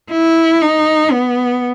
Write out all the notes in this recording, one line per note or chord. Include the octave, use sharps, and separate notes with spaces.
E4
D#4
B3